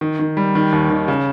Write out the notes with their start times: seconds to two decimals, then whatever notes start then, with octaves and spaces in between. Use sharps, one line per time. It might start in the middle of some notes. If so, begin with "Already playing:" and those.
0.01 D#3
0.19 D#3
0.37 G3
0.55 D#3
0.72 D#2
0.90 D#3
1.08 C#3